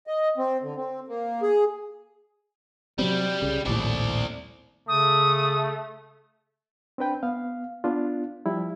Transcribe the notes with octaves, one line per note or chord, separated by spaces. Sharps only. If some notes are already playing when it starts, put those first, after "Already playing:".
D#5
C4
D3
C4
A#3
G#4
C3 F#3 G3 C4
C2 C#3
A#1 D#2 A2 C4 D5
C#3 A3 D#6
C4 D4 B4 G5
B3 F5
B3 D4 F4
F3 G3 E4